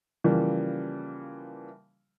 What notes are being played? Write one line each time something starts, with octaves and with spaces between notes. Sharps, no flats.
C#3 E3 F3 G3 A#3